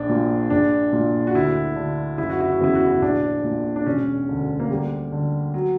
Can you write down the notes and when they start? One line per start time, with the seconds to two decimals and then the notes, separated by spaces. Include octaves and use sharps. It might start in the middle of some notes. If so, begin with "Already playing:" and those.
Already playing: A#1 D4
0.09 A#2
0.50 A#1 D4
0.92 A#2
1.27 F#4
1.34 D2 E4
1.76 D3
2.18 F#1 E4
2.30 F#4
2.40 E4
2.52 F#4
2.60 E2 C#3 E3 E4
2.75 F#4
2.86 E4
3.02 A#1 D4
3.44 A#2
3.76 D4
3.86 E1 C#4
4.28 D2 D3
4.60 A#3
4.70 D2 G3
5.12 D3
5.54 F#3